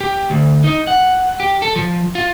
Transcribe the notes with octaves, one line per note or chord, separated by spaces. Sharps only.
G4
D2
D#4
F#5
G4
A4
F3
F4